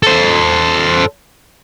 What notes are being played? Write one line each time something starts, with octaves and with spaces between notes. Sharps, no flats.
A4 C5